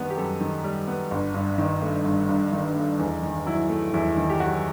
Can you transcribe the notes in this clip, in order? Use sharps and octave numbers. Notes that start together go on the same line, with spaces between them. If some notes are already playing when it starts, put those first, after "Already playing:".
Already playing: F#2 D#3 G3 B3 G4
G4
F#2 A4
D#3
G3
B3
G1
G2
D#3
A3
G1
G2
D#3
A3
E2 D#4
D#3
F#3 E4
A3
E2 E4
D#3
G4
F#3 F#4